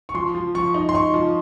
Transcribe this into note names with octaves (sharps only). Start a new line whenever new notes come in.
C#6
F3 C6
F3
F3 C#6
D#4
C6
D#4 C#6
F3